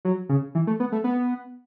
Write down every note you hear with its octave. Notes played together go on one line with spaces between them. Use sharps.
F#3
C#3
E3
A3
B3
A3
B3